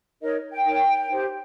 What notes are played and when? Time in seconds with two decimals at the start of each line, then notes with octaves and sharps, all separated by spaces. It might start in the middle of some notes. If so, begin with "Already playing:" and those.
0.21 D#4 A#4 C#5 D#5
0.51 G5
0.65 D#4 A#4 C#5
1.09 D#4 G4 C5